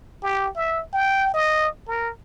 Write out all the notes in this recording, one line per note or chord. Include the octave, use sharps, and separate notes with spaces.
G4
E5
G5
D#5
A#4